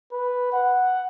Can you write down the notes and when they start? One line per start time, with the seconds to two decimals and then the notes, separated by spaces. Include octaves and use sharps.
0.12 B4
0.52 F#5